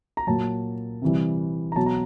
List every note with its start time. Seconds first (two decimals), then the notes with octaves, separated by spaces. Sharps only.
0.17 A#5
0.27 A#2 F#3 A5
1.02 C3 E3 G3
1.72 A#5
1.76 B2 F#3 A5
1.86 A#5